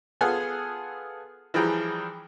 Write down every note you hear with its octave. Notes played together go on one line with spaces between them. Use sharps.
B3 F4 G#4 A4 F#5 G#5
E3 F3 G3 G#4 G5 A#5